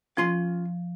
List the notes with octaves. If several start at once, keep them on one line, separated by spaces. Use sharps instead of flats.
F3 C#4 F4 C6